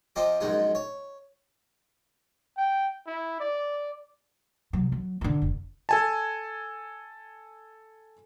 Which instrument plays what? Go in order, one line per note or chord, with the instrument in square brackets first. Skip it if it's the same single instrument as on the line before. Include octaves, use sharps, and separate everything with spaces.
[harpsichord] F3 C4 D#5 D6
A#1 F#2 G#3 D#4
C#5
[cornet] G5
E4
D5
[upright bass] C3 F#3
F#3
D3 E3
F1
[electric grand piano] A4 G#5 A5